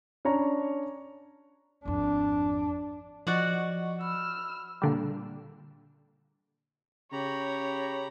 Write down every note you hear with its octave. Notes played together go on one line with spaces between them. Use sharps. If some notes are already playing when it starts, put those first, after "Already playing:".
C#4 D4 C#5 A#5
G#1 F2 D4
F3 F#4 D5 D#5 F#5 C#6
B5 E6 F6
A#2 D3 G3
C#3 G4 C#5 A#5 B5